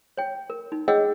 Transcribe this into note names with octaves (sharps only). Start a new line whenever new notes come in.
C#5 G5
A#4
D#4
G#4 C#5 D#5 F#5 G5 E6